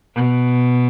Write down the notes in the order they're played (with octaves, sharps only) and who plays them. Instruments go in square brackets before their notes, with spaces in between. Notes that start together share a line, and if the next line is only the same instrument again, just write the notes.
[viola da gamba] B2